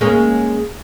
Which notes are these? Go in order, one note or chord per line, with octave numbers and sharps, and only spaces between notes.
G#3 A#3 C#4